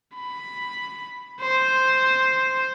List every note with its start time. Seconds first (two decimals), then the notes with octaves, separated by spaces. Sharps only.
0.15 B5
1.41 C5